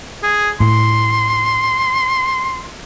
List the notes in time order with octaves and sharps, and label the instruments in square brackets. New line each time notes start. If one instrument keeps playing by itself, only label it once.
[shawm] G#4
[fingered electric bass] A2 [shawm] C6